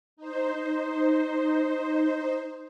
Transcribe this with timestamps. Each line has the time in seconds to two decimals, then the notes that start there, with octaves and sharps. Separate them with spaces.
0.17 D#4 C5